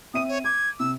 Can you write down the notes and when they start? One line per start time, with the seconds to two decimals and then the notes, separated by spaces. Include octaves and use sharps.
0.14 C4 E5 D#6 D#7
0.28 C#5
0.44 D6 G#6
0.80 C3 E6